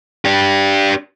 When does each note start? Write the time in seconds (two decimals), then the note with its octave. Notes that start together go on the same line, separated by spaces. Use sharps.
0.25 D4 G4